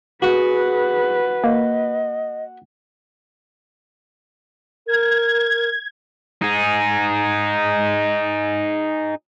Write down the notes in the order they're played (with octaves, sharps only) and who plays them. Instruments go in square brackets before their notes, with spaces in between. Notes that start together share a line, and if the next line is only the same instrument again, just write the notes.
[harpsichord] F#4 [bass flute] G#4 [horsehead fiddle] B4
[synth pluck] A#3 [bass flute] D#5
[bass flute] A#4 [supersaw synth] G#6
[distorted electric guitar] D#4 G#4